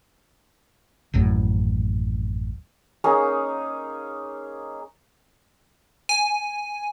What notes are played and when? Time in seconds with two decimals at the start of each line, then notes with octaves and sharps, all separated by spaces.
1.14 D#1 A1 F#2 A2
3.04 A#3 C#4 D#4 G#4
6.09 G#5